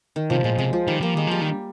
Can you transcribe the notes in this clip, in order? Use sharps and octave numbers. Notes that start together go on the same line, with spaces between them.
D#3
C3 F3
A#2 G#3
C3 G#3
F3
D#3 G3
F3 A#3
D#3 G#3
F3 G3
D#3